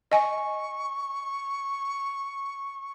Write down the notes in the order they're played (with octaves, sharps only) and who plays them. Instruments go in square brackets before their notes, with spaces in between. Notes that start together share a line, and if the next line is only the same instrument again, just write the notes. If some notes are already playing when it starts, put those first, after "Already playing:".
[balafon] D#5 G#5 [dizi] C#6